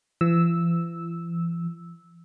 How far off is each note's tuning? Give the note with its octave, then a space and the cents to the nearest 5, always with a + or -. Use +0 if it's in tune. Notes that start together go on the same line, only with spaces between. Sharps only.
E3 +45 E6 -10